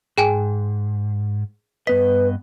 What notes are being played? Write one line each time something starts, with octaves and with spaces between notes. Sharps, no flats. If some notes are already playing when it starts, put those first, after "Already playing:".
G#2 G#4 G5 G#5
G2 B3 B4 D#5 B6